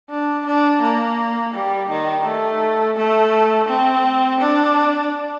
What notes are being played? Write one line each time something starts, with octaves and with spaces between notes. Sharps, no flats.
D4
D4
A#3
G3
D#3
A3
A3
C4
D4